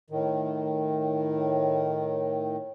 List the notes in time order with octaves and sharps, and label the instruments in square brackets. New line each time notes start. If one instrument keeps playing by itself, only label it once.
[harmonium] A2 D#3